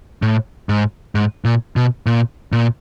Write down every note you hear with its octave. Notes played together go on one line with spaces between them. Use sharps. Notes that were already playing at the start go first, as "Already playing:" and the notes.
A2
G#2
G#2
A#2
B2
A#2
A#2